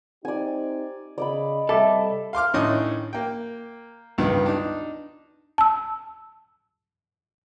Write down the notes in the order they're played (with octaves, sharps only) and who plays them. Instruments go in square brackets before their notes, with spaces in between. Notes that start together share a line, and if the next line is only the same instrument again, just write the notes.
[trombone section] C4 D#4 G4 [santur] D5 G#5
[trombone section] C#3 [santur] D5 D#5 B5
[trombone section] C3 G3 [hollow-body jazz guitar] A4 [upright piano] E5 D6
[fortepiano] F5 C6 D6 F6
A2 D#3 C#4 D4 D#5 D#6
A#3 G5
C#2 G2 D#3 B3
D4 D#4
[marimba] A5 E6